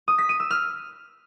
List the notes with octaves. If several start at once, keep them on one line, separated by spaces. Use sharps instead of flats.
D#6
B6
D#7
E6
F6